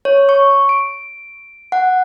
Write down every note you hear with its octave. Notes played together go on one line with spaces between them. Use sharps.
C#5
C#6
D7
F#5